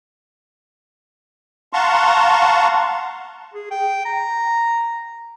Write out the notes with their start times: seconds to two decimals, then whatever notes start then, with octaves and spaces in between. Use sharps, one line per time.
1.73 F5 F#5 A5 A#5 C6 C#6
3.54 G#4
3.71 G5
4.05 A#5